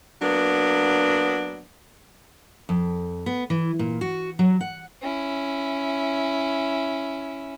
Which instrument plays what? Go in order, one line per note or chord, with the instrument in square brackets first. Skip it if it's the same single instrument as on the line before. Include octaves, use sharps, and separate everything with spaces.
[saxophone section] F#3 A#3 B3 D4
[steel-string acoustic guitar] F2
B3
E3
A#2
F#4
F#3
F#5
[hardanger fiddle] C#4 E4